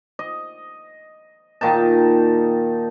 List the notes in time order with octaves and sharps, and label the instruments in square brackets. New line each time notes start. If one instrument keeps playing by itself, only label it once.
[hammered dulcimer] D#5
A#2 D#3 D#4 A5